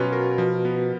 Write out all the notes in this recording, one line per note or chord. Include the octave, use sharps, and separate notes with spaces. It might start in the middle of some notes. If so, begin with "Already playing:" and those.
Already playing: B2 F#3 C#4 F4
A#4
F3
B3